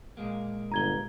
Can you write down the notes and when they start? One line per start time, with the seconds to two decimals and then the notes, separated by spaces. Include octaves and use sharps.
0.17 A#2 G#3 A#3
0.72 G1 A#5 G#6 G7